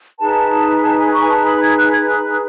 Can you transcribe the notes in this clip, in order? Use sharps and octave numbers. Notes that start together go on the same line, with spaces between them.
D#4 G#4 B4 A5
A5
G#5
C#6
G#5
A5
B5
G#6
F#6
G#6
F#6